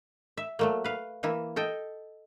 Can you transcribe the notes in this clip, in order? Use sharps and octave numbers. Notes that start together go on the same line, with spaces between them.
E5
F#3 A3 A#3
B4 F5
E3 A#3 E4
A4 D#5 G5